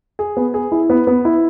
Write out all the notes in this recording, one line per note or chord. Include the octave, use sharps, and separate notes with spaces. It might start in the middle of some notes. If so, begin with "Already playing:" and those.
G#4
B3
G#4
E4
B3
B3
E4